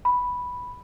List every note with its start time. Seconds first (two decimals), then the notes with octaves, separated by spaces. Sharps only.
0.05 B5